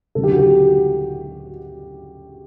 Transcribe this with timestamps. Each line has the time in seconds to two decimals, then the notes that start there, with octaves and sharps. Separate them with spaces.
0.15 D2 C#3 F#3 A4
0.24 G4
0.31 F#4
0.39 G4